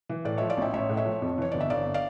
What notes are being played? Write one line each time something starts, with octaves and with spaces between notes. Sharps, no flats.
E3
A2 D5
F3 C#5 E5
D5 F5
A1 E5 G5
A1 C#5 E5
A2
C#5 E5
F3
F2
E3 C#5
G1 D5
E5
G1 D5 F5
D5 F5